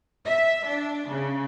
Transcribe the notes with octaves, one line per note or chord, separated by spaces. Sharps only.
E5
D4
C#3